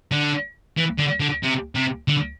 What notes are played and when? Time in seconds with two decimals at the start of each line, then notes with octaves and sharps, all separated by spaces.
0.11 D3
0.77 E3
0.99 D3
1.20 D3
1.43 C3
1.75 C3
2.08 D3